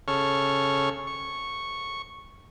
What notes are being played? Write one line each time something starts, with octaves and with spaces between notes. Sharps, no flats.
C#3 A4 C#5 C#6 F6
C#6